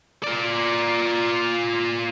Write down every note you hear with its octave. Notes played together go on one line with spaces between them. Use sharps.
F4 D5